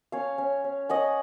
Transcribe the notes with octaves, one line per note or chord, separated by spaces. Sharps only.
C#4 C#5 F5
C#4
C#4
C#4 D#5 F#5